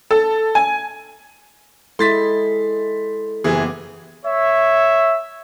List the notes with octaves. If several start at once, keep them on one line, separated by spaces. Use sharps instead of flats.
A4
G#5
G#3 E4 A4 C6 A6 B6
F#1 E3 B3 G4 G#4
C#5 E5